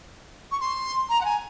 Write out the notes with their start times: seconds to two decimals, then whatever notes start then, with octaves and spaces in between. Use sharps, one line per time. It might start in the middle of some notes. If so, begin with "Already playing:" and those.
0.51 C#6
0.60 C6
1.09 A#5
1.21 F#5
1.24 G#5